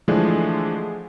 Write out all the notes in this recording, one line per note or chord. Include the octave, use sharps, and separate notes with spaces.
D3 E3 F3 G#3 A3 D4